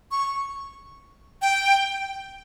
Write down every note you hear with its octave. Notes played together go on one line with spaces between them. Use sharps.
C#6
G5